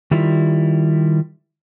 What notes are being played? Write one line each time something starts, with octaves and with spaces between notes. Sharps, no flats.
D#3 G3 E4 F4